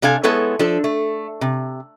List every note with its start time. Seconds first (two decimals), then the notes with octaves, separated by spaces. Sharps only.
0.02 C3 D4 A4 F5 G#5
0.23 G#3 B3 E4 A4 C#5
0.59 F3 D4 A4
0.84 A3
1.41 C3